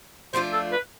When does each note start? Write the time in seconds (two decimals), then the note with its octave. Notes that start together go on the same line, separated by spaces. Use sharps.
0.33 F3 A3 D4 F4 C5
0.53 A4
0.72 B4